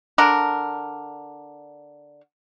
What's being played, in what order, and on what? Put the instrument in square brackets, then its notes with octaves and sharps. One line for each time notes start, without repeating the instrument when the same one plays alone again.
[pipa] D3 D4 A#4